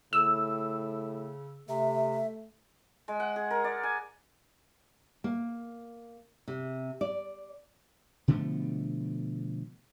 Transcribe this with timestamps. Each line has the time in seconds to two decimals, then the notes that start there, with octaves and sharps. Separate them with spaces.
0.13 A2 C#3 E6
1.69 C3 A3 E5
3.08 G#3
3.20 F#5
3.36 G#4
3.51 A#4
3.64 D5
3.83 G#5
5.24 A#3
6.48 C3
7.01 D5
8.28 B2 D3 F3 A3